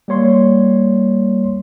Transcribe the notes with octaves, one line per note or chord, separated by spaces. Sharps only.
G3 A#3 C#5 C6